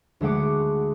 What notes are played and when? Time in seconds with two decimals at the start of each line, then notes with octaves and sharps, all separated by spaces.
0.21 D2 G#3 A3 F#5 D6